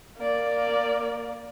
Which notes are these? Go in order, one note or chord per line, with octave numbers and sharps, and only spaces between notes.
A#3 D5